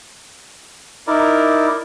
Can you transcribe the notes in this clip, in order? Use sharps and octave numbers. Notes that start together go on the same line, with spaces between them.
D#4 E4 A#4 D5